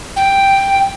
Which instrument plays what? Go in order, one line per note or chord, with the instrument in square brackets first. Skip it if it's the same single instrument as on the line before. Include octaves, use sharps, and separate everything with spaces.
[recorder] G5